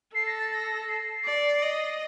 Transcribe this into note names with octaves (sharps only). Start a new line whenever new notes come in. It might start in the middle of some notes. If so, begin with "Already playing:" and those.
A4 C7
A#6
A6
A#6
C7
D5
D#5